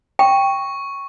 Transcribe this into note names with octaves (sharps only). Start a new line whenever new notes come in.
G5 C#6